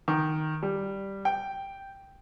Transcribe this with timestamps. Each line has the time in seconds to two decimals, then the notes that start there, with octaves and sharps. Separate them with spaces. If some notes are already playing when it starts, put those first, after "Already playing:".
0.08 D#3
0.63 G3
1.25 G5